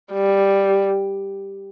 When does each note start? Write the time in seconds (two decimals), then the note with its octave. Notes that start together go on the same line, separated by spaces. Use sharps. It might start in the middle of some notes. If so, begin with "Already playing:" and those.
0.12 G3